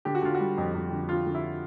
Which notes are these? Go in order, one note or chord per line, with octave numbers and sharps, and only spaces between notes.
D3 G4
F#4
D3 F4
G3 F#4
F2
F2
D3
D3 F4
D3
E4